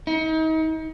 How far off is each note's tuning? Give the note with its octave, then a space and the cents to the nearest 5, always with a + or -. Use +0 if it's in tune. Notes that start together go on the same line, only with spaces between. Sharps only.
D#4 +35